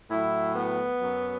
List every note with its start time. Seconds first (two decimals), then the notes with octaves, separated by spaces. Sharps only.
0.10 A2 F#3 E4
0.55 B3
1.00 F#2 F#3